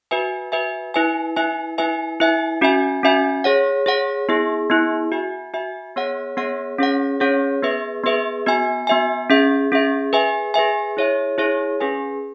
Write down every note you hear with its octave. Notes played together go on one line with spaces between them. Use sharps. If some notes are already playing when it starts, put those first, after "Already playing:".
F#4 B4 E5 G#5
F#4 B4 E5 G#5
E4 B4 E5 G#5
E4 B4 E5 G#5
E4 B4 E5 G#5
E4 B4 E5 G#5
C#4 F#4 E5 G#5
C#4 F#4 E5 G#5
G#4 C#5 F#5
G#4 C#5 F#5
B3 E4 G#4
B3 E4 G#4
F#4 E5 G#5
F#4 E5 G#5
B3 G#4 C#5 F#5
B3 G#4 C#5 F#5
C#4 G#4 C#5 F#5
C#4 G#4 C#5 F#5
B3 G#4 B4 E5
B3 G#4 B4 E5
B3 F#4 E5 G#5
B3 F#4 E5 G#5
C#4 G#4 E5
C#4 G#4 E5
G#4 B4 E5 G#5
G#4 B4 E5 G#5
E4 G#4 C#5 E5
E4 G#4 C#5 E5
C#4 G#4 B4 G#5